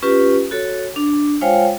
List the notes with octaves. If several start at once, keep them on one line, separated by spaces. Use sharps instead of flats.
C#4 F4 G4 B4
F#4 A4 C#5
D4
G#3 F4 C5 C#5 F5 G5